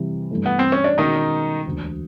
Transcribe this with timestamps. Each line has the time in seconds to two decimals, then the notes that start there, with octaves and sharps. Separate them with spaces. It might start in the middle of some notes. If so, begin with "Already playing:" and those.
Already playing: C3 E3 G3 C4 E4
0.31 G2 E3 A3
0.46 B3
0.59 C4
0.72 C#4
0.84 D4
0.98 B2 D#3 G#3 C#4 D#4 F#4
1.66 E1 D2 D3